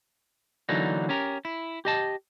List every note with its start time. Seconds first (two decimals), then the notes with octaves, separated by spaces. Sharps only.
0.69 D3 E3 F#3 A#3 D4 D#4
1.09 C#4 G4 A#4
1.45 E4
1.85 G4 D#5 A5